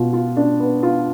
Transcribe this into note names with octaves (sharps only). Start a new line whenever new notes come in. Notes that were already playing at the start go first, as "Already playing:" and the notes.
Already playing: B2 F4
F4
D4
B3
F4